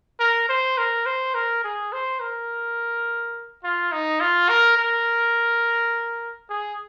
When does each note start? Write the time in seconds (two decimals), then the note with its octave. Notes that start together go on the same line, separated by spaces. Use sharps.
0.20 A#4
0.49 C5
0.78 A#4
1.06 C5
1.34 A#4
1.64 G#4
1.92 C5
2.20 A#4
3.64 F4
3.92 D#4
4.20 F4
4.49 A#4
4.77 A#4
6.50 G#4